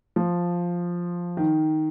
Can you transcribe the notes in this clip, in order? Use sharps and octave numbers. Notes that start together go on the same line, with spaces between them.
F3
D#3